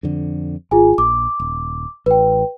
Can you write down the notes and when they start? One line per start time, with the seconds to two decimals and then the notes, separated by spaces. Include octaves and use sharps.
0.03 F2 D3
0.71 G#1 F4 G#4 G#5
0.98 A#1 D6
1.40 D#1
2.06 A1 B4 G5